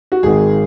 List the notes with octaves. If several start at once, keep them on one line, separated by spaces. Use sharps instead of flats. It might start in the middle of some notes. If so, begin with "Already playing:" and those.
F#4
G#1 G#2 D#3 G#4